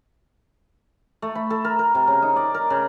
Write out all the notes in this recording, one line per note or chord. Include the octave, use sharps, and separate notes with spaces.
A3
B5
A4
A#4
A#4
C3
C#3
D#4
D5
A#4
C#3